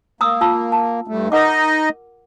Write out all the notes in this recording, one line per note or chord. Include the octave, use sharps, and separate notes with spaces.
A#3 A#5 D#6 E6
F4 A5 E6
A5
G2 A3
D#4 A#4 D#5 F#5 D6